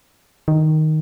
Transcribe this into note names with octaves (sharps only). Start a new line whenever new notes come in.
D#3